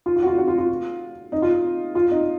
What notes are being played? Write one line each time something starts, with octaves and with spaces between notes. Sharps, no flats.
F4
F4
F#4
F4
F#4
F4
F4
D#4
F4
F4
D#4